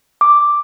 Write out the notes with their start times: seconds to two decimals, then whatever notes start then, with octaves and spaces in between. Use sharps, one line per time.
0.21 D6